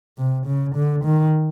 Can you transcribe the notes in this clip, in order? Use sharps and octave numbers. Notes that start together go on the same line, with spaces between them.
C3
C#3
D3
D#3